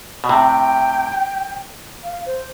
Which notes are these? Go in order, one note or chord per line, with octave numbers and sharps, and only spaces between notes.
B2
A2 C3 G5
F5
C5